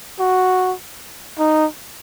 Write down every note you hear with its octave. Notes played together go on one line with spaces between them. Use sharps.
F#4
D#4